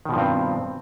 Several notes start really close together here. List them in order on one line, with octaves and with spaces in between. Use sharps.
D#3 B2 F3 G2 C4